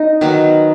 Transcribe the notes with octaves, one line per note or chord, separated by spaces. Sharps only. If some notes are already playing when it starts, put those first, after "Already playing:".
Already playing: D#4
D#3 F#3 B3